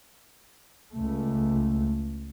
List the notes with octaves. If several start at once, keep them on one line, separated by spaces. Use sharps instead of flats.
C#2 A3